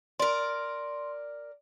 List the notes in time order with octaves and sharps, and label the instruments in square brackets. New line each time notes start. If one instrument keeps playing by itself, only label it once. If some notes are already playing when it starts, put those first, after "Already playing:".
[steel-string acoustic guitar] A#4 D5 [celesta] C6